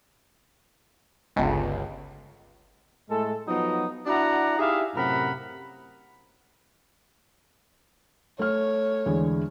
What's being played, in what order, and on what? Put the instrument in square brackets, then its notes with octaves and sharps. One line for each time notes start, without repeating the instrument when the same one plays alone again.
[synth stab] G1 C#2
[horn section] A2 G#3 A3 A4
F3 F#3 B3 D#4
D4 E4 F#4 D5 F#5 A#5
D#4 E4 G4 G#4 E5 F5
F#2 A2 C3 A#4 F#5 B5
[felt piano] A3 F6 [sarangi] C#5
[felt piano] E2 D3 G#3